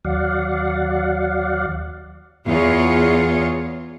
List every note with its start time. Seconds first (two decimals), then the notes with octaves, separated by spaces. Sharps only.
0.05 D#2 F#3 D5 F5 F#5
2.47 E2 F4 G#4 C#5